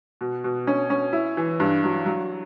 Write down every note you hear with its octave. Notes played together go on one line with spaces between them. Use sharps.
B2
B2
C#4
C#4
E4
E3
G2
F#3
F#3